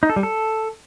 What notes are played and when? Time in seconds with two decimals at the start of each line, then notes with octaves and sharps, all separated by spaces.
0.03 D#4
0.10 A4
0.16 G3
0.23 A4